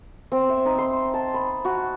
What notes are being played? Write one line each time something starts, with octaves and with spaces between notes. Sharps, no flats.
C4
E5
D#4
C6
A5
B5
F#4